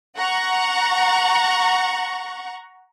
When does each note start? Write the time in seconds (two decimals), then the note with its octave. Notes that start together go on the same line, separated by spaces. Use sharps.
0.17 F#5 A#5 C#6